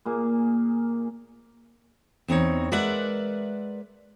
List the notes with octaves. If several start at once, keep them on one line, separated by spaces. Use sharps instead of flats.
A#2 A#3 G#4
E2 C4 D#4 C#5
G#3 A#4 B4 D5 E5 F#5